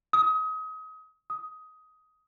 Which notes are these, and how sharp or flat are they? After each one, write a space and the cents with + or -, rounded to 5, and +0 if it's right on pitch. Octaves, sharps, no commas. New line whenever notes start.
D#6 +30
D#6 +15